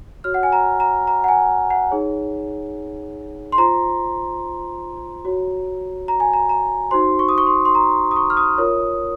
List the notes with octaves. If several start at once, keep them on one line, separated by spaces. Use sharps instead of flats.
F#4 C#5 F6
F#5
G#5
A#5
A#5
A#5
F#5
G#5
F#5
D#4 G#4 C#5
C6
F4 C5 A#5
F#4 C#5
A#5
G#5
A#5
A#5
D#4 F#4 C5 C6
C#6
D#6
C#6
C6
C6
A#5
D#6
C#6
F6
D#6
F4 A#4 C#5